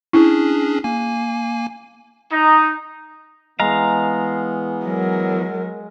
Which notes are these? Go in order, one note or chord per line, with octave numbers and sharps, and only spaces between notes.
C#4 D4 E4 G#4
A#3 G#5
D#4
E3 G#3 B3 F5 A#5
F#3 A#4